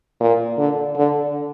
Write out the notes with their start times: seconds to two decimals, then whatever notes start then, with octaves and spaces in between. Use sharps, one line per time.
0.21 A#2
0.58 D3
0.97 D3